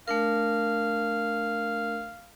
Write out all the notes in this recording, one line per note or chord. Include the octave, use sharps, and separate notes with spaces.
A3 D4 A#4 F5